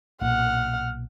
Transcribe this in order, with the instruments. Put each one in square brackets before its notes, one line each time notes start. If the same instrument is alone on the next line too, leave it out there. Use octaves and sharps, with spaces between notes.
[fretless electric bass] B1 A#2 [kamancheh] F#5 F6